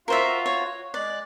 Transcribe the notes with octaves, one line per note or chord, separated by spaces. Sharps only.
F4 F#4 A#4 C5 E5 F5
C#5
G#3 D5 F#6